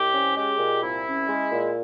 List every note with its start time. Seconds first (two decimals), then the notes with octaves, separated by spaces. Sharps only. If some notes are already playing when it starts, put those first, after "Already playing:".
Already playing: C2 G4
0.13 C#4
0.36 G#3 G4
0.59 A#2
0.83 C2 E4
1.05 C#4
1.28 G#3
1.51 A#2